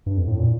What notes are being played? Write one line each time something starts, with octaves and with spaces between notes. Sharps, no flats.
G2
F2
A2
A#2